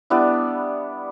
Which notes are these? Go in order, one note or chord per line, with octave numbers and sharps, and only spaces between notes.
G3 B3 D4 E4